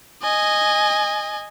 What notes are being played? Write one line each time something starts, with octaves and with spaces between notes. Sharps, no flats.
D#5 G#5